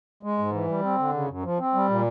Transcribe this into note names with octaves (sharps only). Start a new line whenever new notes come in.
G#3
G#2
E3
G3
C4
D3
C#3
F#2
F3
C4
G3
A#2